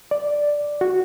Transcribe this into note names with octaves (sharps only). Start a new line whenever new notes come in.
D5
F#4